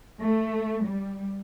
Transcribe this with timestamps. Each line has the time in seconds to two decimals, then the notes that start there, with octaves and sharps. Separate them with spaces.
0.21 A3
0.86 G3